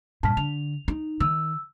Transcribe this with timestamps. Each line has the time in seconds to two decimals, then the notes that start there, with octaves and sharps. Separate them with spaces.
0.23 G2 A#2 A5 F6 B6
0.37 D3 F7
0.88 D#4
1.20 D#3 E6